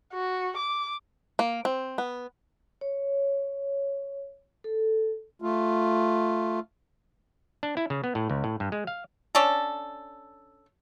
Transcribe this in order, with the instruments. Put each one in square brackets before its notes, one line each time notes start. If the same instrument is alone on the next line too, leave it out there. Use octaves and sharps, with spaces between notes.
[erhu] F#4
D6
[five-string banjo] A#3
C4
B3
[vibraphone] C#5
A4
[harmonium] A3 F4
[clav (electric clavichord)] D4
E4
C#3
B3
A2
C#2
A2
G2
G#3
F5
[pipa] C#4 D4 A4